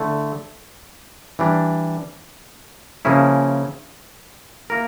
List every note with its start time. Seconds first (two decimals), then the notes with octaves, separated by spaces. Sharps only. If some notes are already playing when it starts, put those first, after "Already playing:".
Already playing: D3 A3 E4
1.39 E3 G3 D4
3.05 C#3 F3 A#3 C#4 E4
4.70 A#3 E4 A#4